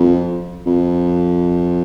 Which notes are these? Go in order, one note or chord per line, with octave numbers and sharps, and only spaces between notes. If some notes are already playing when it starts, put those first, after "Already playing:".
Already playing: F2
F2